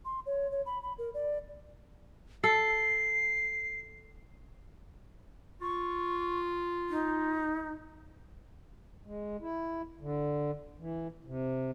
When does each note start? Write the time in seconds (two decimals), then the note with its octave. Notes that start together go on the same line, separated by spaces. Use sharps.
0.05 C6
0.26 C#5
0.52 C#5
0.66 B5
0.83 B5
0.98 A#4
1.14 D5
2.44 A4 C7
5.61 F4 C#6
6.89 D#4
9.05 G#3
9.41 E4
10.01 D3
10.79 E3
11.26 C3